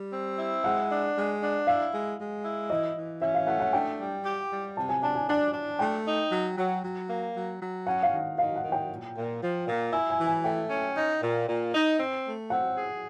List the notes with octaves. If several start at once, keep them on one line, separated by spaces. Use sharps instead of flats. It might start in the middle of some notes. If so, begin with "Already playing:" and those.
Already playing: G3
C4
E4
G#3 F#5
D4
G#3
D4
E4 F5
G#3
G#3
E4
E3 D#5
E3
C#4 E5
F5
A3 F#5
F#5
D4 G5
G3
G4
G3
C3 A5
G#5
D4 A5
G#5
D4 A5
D4
A3 G5
D#4
F#3
F#3
F#3
A#3
F#3
F#3
C#4 F#5
F5
D#3
D#3 F5
F#5
D#3
G5
A#2
A#2
F3
A#2
E4 G#5
G#5
E3
G#5
A3 G5
C#4
D#4
A#2
A#2
D#4
C4
A3
C4 F#5
G#4